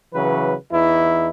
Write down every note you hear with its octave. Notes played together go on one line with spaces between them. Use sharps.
C#3 E3 F#3 B4
E2 E3 D#4 E4